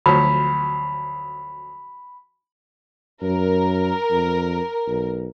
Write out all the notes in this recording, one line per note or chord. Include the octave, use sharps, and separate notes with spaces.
D2 F3 F#3 B5
F#2 A#4
F2
B1